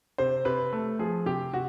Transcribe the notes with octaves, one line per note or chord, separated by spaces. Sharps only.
C3 C5
C3 B4
A3
F3 G#4
C3 G4
C3 F#4